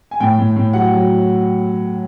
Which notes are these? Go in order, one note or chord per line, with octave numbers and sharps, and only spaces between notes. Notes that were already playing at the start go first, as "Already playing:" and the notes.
G#5
A2 G5
A2
A2
F#3 F#5
F#3